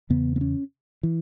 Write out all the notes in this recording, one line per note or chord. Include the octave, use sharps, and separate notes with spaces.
E2 C#3 B3
B3
C#4
E3